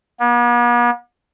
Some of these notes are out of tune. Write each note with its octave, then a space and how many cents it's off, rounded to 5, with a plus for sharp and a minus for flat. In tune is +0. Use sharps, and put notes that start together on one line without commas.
B3 -45